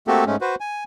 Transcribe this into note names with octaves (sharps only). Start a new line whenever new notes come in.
A3 A#3 C4 F#4 G4 A4
G#2 G#3 A3 C#4
F#4 B4 C5
G#5